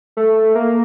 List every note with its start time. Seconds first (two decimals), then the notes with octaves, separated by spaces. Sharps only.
0.17 A3
0.55 A#3